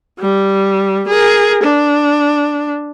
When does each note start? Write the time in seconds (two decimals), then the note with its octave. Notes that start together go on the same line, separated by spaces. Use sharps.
0.20 G3
1.08 G#4 A#4
1.63 D4